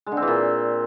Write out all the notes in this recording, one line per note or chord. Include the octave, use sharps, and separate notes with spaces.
G#3
D3
C4
E3
A#2